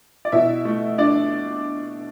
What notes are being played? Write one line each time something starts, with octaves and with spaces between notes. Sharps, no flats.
D5
B2 E4 E5
A3
D4 D5